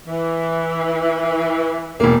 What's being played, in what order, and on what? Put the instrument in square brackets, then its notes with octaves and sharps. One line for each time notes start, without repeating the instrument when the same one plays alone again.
[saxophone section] E3
[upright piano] E1 A#3